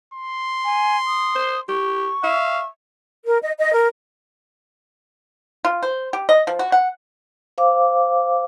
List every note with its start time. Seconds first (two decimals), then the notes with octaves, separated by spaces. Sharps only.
0.14 C6
0.65 G#5
1.07 D#6
1.35 C5
1.68 G4 C#6
2.23 E5 F5
3.25 A#4
3.42 D#5
3.58 D#5
3.74 A#4
5.65 F4
5.83 C5
6.13 G4
6.29 D#5
6.47 F3
6.59 F#4
6.72 F#5
7.58 C5 F5 D6